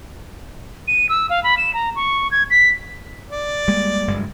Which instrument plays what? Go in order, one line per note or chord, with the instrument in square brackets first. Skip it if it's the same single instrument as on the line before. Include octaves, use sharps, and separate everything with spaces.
[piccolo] D#7
E6
F5
B5
E7
A#5
C#6
G#6
B6
[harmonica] D5
[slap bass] G3 G#3 A#3
F#1 G2 G#3